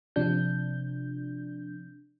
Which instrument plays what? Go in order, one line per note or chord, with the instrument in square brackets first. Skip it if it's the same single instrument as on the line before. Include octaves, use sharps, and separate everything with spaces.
[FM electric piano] C3 F3 D4 G6